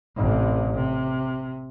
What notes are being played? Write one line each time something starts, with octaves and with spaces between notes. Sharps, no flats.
A1 C3
C3